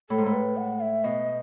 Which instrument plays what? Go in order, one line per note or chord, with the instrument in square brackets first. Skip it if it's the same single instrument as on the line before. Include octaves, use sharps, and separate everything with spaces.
[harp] A2 [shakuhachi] A4
[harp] G#2
A2
[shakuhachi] B4
F#5
E5
[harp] B2 [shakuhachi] D#5